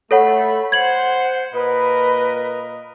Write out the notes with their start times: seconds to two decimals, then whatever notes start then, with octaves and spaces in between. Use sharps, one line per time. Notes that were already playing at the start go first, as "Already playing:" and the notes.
0.11 A3 A4 C#5 F#5 B5
0.72 C5 F#5 G#6 F#7
1.53 A#2 A#4 B4 D#5